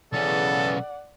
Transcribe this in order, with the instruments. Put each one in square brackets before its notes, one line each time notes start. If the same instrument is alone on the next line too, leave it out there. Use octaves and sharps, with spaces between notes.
[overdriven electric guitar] B1 C#4 [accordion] C#3 E3 B3 [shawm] A4 [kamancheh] D5 F#5